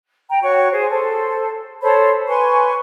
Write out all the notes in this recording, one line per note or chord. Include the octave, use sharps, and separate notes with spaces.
G5 A#5
F#4 C#5 C#6
G#4 C5
A4 C5
A4 C5 C#5 B5
B4 G#5 C6 C#6